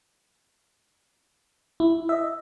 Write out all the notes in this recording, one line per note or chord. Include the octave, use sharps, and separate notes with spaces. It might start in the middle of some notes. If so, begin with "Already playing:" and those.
E4
D#5 E5